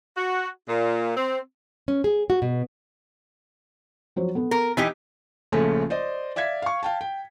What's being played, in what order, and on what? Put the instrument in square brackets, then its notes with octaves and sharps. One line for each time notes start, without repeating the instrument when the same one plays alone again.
[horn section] F#4
A#2
C4
[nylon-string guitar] C#4
G#4
F#4
B2
[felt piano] F3 F#3 C5
B3 A4
[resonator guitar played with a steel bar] A#4
[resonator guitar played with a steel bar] E3 D#4 G4 [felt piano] B6
[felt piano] A#1 C#3 F3 A3 C#4 A4
C5 D5 D#5
D5 E5 F5 G#6 B6
F5 C#6
F5 G5 A5
G5